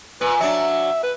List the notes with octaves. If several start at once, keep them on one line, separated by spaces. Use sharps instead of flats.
A#2 B4
F#3 D4 E5
B4